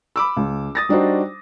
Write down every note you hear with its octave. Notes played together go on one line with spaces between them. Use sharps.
B5 D6 E6
C#2
D#6 A6 A#6
G3 D4 D#4 F#4 C5